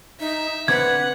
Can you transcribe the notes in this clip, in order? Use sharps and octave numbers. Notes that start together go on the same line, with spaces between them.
D#4 E5
D3 C4 B4 D5 F#5 G#6